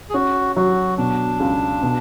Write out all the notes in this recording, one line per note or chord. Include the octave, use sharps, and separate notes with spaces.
G#4
C#4 F#4
F#3 F#4
B2 D4
C#2
B2